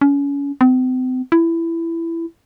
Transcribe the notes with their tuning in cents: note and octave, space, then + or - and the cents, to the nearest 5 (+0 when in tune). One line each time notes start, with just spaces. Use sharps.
C#4 +30
C4 -40
E4 +15